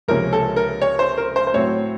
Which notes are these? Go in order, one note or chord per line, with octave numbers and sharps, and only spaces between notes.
C#2 C3 F3 A#3 C#4 A#4
A4
A#4
C#5
C5
A#4
C5
C5
A2 F#3 C4 C#5